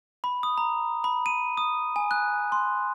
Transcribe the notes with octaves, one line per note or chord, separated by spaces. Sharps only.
B5
D#6
A#5
B5
D#7
D#6
G#5
F#6
C6